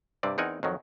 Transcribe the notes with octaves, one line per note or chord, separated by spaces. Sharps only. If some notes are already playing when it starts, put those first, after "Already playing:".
G2 C3 C4 D5
E2 C4 D#4 A#4 F#5 G#5
F2 D#3 F#3